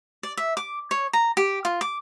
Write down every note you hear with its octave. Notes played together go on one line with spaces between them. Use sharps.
D5
E5
D6
C#5
A#5
G4
F4
D6